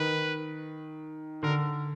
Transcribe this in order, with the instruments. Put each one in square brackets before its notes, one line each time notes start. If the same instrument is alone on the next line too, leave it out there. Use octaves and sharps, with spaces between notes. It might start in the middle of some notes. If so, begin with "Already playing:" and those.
Already playing: [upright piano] D#3 [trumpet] B4
[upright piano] D3 [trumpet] A#4